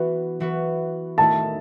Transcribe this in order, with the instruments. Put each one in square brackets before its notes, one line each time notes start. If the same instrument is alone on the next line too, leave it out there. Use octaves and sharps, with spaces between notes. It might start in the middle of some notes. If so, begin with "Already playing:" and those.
Already playing: [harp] E3 B3 F#4 B4
E3 B3 F#4 B4
[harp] D#3 A3 E4 [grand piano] A5